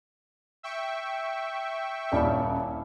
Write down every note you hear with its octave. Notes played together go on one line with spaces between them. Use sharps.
E5 G5 C#6
D#1 C#4 D4 E4 F5